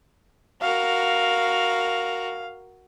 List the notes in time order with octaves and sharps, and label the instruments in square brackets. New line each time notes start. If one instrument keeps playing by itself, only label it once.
[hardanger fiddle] F#4 A#4 [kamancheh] F5